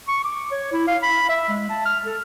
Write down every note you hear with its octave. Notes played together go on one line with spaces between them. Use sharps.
C#6
D6
C#5
E4
F5
B5
E5
G#3
A5
F6
A4